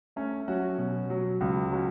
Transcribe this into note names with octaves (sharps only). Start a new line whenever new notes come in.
A3 C#4
F#3 C#4 F#4
B2
F#3
C#2
F#3 C#4 F#4